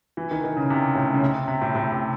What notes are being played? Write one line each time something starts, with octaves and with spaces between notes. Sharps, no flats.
E3
D#3
D#3
C#3
C3
A2
C#3
C3
C3
A2
A2
C3